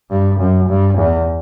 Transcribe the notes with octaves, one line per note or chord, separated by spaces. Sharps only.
G2
F#2
G2
E2